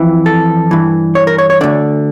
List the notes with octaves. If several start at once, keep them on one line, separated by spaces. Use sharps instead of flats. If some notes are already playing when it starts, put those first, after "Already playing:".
Already playing: F2 E3
A4
G2 E3
C#5
A#4
C#5
C#5
D2 D3 D5